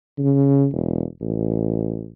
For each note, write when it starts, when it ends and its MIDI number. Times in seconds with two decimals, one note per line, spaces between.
0.18 0.67 49
0.72 1.04 28
1.21 2.11 33